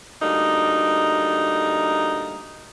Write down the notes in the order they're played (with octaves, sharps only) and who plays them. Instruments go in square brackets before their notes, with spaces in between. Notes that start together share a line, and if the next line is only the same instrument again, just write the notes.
[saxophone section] D2 G3 A#3 D#4